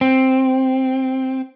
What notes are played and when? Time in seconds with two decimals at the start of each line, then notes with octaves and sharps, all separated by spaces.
0.01 C4